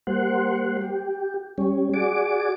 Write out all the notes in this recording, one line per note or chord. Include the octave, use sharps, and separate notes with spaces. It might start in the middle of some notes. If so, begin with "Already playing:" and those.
G3 A#3 C5 F#5
G4
G3 C#4
F#4 G#4 D5 D6